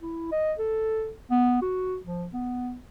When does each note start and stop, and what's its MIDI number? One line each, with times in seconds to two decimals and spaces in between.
0.02 0.30 64
0.32 0.53 75
0.59 1.11 69
1.30 1.57 59
1.62 1.97 66
2.04 2.26 53
2.33 2.75 59